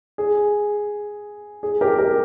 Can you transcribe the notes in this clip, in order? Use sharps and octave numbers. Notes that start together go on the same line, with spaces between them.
G#4
G#4
G4 A#4
G4 A#4